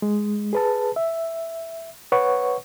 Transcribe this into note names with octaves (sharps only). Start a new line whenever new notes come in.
G#3
G#4 B4 A5
E5
B4 C#5 F#5 C#6